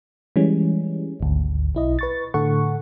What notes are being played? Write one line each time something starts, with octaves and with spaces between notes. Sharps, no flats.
E3 G3 G#3 C#4
G#1 D2
B1 E4 D#5
B4 C#6 A6
A2 D3 A4 F#5 C#6